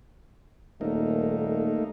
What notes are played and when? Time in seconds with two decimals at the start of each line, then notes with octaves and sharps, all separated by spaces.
0.81 D#1 A3 A#3 D#4